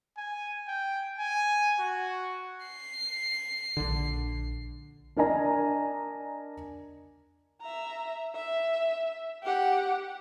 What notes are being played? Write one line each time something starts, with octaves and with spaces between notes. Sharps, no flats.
G#5
G5
G#5
F#4
C7
A#1 D3
D4 A#4 D5 D#5 G#5 A#5
E5 A#5
E5
G4 F#5